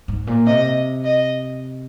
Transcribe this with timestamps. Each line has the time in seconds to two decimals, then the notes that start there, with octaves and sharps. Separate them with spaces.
0.08 G#2
0.27 A#2
0.46 C3 D#5
1.04 D#5